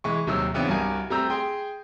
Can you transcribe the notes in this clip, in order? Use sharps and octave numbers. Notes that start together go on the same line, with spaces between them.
E3 G#3 C#6
D#1 C3 D#3 F#3 E6
C#3 E3 B3 C4 D4
C2 G2 F#4 A#4 G#5
G3 A3 C4 A#5 E6 G6
G#4 G5 C6